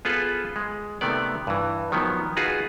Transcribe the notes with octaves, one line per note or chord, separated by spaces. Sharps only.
B3 F4 G#4 A4 B4
G#3
C3 D#3 A3 B3 D5
G2 E3
D#3 F3 F#3 B3
D#4 F4 F#4 G#4 B4